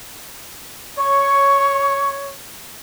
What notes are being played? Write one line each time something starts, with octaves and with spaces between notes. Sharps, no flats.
C#5 C#6